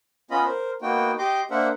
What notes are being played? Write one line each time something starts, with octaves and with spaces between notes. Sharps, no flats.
B3 C#4 F4 D#5 B5
A#4 C5
A#3 B3 D#4 F#4 G5
G4 D#5 C6 D6
A#3 D4 A#4 C5 E5 F#5